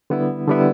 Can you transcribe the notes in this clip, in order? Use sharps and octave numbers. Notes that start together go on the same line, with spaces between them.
D3 G3 B3 E4
D3 G3 B3 E4